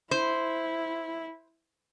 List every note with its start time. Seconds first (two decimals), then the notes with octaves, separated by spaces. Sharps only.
0.11 E4 C5